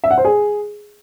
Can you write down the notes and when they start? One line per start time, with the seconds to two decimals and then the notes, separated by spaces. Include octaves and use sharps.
0.04 E5
0.11 F#5
0.18 C5
0.25 G#4